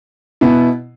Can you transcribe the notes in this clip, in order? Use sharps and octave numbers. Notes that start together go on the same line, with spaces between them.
B2 B3 E4